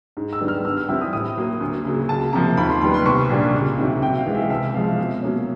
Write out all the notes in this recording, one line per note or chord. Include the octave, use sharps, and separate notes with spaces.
G#2
E6
D#3 G3 B3 D4
F6
G2 E6
F6
E3 G3 C4 E4 E6
D#6
A2 D#6
F#3 A#3
D2
C#3 F#3 A#3
C#2 A5
C3 F3 A#3 A#5
D#2 B5
C6
D#3 G3 B3 B5
C6
C2 C#6
A#2 G3 A#3 D4
C#2
C3 D#3 F#3
C3 G5
F5
E3 G#3
E5
C2 E5
C3 F3 G#3 F5
B2
F#3 A#3 C#4